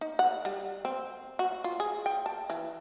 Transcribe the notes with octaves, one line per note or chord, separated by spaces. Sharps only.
D#4
F#5
G3
C4
F#4
F4
G#4
G5
A5
E3